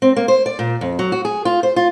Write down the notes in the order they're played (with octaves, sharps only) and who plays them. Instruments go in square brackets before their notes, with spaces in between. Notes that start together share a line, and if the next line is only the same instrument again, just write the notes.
[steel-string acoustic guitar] C4
A#3
C5
D5
A#2
F2
F#3
F#4
G#4
F4
C5
F4